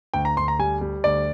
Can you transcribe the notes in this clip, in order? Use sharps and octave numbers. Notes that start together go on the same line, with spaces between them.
D2 G5
A#5
D2 C6
A#5
G3 G#5
G3
D2 D5